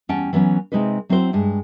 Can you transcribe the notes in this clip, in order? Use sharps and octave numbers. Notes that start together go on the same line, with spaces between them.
E2 G3 C#4 F#5 G5 A5
E3 F#3 B3 C#4
C3 G#3 C4 D#4 B4
F#3 C4 E4 F#4 C5
G2 G#3